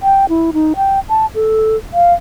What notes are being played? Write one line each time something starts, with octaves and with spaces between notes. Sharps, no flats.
G5
E4
D#4
G5
A5
A4
F5